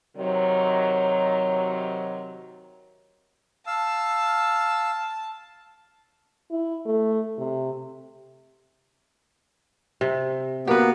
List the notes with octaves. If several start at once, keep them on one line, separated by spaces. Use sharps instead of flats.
C3 D#3 F#3
F5 A5 E6
E4
A3
C3
C3
A#3 B3 F#4 G4 B4